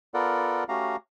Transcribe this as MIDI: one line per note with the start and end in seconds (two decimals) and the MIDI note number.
0.14 0.64 59
0.14 0.64 65
0.14 0.64 69
0.14 0.64 70
0.14 0.64 74
0.14 0.64 78
0.69 0.96 57
0.69 0.96 61
0.69 0.96 66
0.69 0.96 67
0.69 0.96 77
0.69 0.96 82